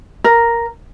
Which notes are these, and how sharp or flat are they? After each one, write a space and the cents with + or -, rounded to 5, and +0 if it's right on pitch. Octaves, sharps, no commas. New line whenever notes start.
A#4 +0